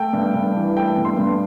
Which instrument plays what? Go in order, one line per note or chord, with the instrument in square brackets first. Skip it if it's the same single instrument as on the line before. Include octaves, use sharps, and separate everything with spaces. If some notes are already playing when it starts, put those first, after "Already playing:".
Already playing: [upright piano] A3 G5
G2
G2
E3
A3 G5
G2
C6
G2